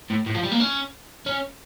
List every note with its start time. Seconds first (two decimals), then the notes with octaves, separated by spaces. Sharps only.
0.10 A2
0.27 A2
0.35 F3
0.43 G3
0.52 A#3
0.60 C#4
1.26 C#4